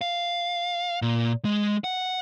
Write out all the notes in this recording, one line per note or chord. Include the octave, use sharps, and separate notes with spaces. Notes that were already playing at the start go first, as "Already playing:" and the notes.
F5
A#2
G#3
F#5